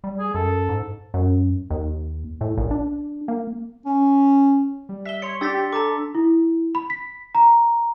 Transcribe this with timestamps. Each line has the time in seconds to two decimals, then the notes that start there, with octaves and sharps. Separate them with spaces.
0.04 G3
0.19 G#4
0.34 F#2 A4
0.69 G#2
1.14 F#2
1.70 D#2
2.41 A2
2.57 A#1
2.71 D4
3.28 A#3
3.86 C#4
4.89 G3
5.06 E5 B6 G7
5.22 C#5 C6 C#7
5.41 D4 G4 E6 A6 B6
5.73 A4 A5 A#5 D6
6.15 E4
6.75 B5
6.90 B6
7.35 A#5